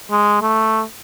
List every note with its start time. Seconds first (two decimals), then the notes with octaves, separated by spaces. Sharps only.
0.11 G#3
0.41 A3